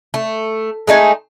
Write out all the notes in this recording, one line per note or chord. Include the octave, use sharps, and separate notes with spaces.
A3
G#3 A3 D#4 G#5